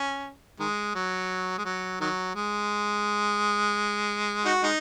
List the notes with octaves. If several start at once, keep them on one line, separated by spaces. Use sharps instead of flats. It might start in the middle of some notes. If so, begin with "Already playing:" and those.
Already playing: C#4
D#3 G#3
F#3
G#3
F#3
D#3 F#3
G#3
D#4 F#4
G#3 D#4